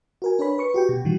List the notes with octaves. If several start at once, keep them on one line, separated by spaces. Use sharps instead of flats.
F#4 A#4 G#5
D4 B4 C#5 B5
B4 C#6 C#7
F#4 G4 G5
B2
A#2 D#3 E3 G3 F#4